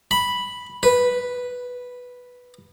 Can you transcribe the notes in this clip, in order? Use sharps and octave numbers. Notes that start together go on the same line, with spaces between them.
B5
B4